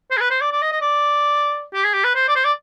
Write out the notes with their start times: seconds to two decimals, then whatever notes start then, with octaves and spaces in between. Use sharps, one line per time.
0.11 C5
0.17 G#4
0.21 B4
0.30 C5
0.41 D5
0.52 D5
0.62 D#5
0.72 D#5
0.81 D5
1.74 G4
1.84 G#4
1.94 G4
2.04 B4
2.15 C5
2.28 D5
2.35 C5
2.45 D5